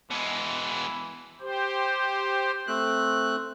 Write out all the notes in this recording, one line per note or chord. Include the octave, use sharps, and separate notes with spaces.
B2 E3 G#3
G4 C5
A3 C4 F#6